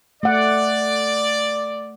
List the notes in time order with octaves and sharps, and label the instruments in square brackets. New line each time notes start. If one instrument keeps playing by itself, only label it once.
[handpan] A3 F#5 [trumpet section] D5